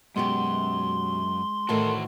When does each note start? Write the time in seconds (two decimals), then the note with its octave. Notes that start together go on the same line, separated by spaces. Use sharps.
0.16 F#2 B2 G#3 B3 G4 C6
1.69 A2 D#3 E3 F#4 A4 A#4 C5 A5